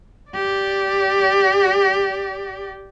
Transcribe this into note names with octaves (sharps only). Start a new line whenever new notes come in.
G4 D5